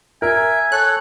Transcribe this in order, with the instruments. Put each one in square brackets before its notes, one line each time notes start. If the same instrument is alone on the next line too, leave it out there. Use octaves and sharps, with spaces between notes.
[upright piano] A#4 [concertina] E5 [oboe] G#5
[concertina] A4 C#5 [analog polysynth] F#6